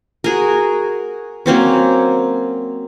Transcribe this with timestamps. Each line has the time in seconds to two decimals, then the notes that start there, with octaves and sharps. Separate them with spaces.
0.24 F#4 G#4 A#4
1.46 F#3 A#3 C4 C#4